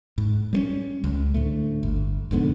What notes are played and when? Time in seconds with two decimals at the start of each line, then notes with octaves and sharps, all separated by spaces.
0.18 G#2
0.53 G3 G#3 C#4
1.04 C#2
1.34 D2 A2 A3
1.83 G1
2.31 F1 G#2 D3 B3